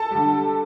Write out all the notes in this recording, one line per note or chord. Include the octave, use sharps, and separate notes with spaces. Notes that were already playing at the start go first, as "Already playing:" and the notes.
Already playing: A4 A5
D3 G3